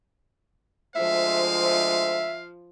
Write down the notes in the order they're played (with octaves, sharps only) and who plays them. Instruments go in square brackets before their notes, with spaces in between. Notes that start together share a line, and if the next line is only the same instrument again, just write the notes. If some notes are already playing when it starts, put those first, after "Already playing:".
[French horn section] D2 G#3 C5 [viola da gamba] F3 F4 [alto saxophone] E5 [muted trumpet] F5
[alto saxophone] E5